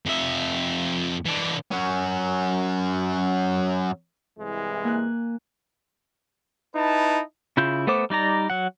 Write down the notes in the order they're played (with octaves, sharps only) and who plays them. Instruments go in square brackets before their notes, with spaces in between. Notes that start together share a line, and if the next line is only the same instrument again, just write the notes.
[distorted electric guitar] F2 E5
E3 D4
F#3 C#4
[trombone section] C2 E3 G#3
[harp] A#3 G#5 F#6
[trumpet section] D#4 E4 B4 A5
[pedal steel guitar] C#3 E4 F4 G6
A3 B3 A4 C5 D6
G3 D#4 D5 A#5
F#3 F#5